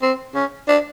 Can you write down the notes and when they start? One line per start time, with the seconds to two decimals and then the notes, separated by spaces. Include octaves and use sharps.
0.02 C4
0.35 C#4
0.68 D4